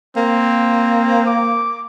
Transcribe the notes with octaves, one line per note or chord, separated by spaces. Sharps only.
A#3 C4
D6